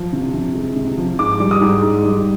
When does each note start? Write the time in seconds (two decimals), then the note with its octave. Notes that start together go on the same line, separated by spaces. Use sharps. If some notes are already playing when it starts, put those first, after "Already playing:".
Already playing: F3
0.13 C3
0.34 C3
0.55 G#3
0.76 C3
0.97 F3
1.19 G#2 D6
1.40 G3
1.51 D#6
1.61 G#2
1.82 G#2
2.03 G3